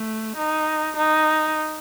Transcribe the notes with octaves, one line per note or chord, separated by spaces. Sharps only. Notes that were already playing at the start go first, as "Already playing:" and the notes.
Already playing: A3
D#4
D#4